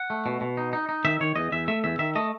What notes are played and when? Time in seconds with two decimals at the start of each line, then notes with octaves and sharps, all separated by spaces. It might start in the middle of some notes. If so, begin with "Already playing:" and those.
Already playing: F#5
0.10 A3
0.26 B2
0.41 B2
0.57 D#4
0.73 D#4
0.89 D#4
1.05 D#3 E5
1.21 D#3 C#5
1.36 E2 D#5
1.52 E2 E5
1.68 A3 E5
1.84 E2 E5
1.99 D#3 E5
2.15 A3 D#5